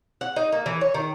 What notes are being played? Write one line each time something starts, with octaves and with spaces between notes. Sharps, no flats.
F#5
D#4
A#3
E3
C#5
D#3